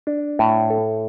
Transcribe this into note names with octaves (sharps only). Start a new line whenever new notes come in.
D4
A2
A4